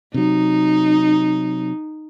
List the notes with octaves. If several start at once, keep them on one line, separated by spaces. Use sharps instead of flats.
C3 F#3 D#4